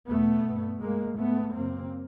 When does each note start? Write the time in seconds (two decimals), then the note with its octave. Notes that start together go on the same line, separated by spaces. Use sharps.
0.08 E2 B2 A3 B3
0.46 G2
0.81 G2 G#3 A#3
1.17 G#2 A3 B3
1.54 F#2 C#3 A#3 C4